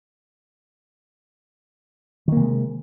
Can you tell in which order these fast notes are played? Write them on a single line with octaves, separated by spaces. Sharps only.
D#3 A#3 C3 G#3